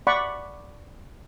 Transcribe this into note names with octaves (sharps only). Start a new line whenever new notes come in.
D5 F#5 B5 C#6